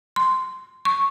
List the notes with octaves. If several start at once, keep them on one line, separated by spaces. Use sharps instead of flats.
C6
C#6